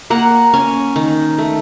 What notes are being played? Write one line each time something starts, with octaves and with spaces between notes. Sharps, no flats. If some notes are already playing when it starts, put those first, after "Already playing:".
A#3 F#5
C#4 G#5
D#3
A3